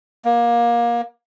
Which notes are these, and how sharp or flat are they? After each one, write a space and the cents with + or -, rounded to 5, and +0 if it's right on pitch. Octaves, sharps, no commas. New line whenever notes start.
A#3 +20